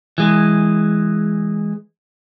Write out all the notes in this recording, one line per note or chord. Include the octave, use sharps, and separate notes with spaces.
E3 G#3